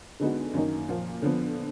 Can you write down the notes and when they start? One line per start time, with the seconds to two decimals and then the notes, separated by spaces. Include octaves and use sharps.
0.20 D3 G#3 B3 D#4 F#4
0.54 F#2 D#3 A#3 D#4
0.89 A#2 F3 A#3 F4
1.22 D3 F3 B3